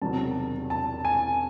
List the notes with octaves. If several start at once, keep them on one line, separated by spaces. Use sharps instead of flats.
E1 E2 C3 D#3 F#3 A5
A5
G#5